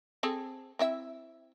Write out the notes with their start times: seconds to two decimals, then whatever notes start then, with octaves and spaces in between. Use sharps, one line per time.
0.23 C4 G#4 A4
0.79 C4 E4 E5